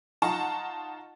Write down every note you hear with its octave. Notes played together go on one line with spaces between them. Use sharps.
D#4 F4 F#5 A5 A#5 C#6